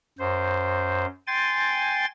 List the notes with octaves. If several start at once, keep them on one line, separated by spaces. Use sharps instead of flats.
F#2 C5
G5 G#5 C6 A6